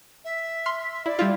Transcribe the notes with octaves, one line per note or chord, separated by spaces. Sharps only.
E5
C6 F6
E4 D5
G3 E4 F4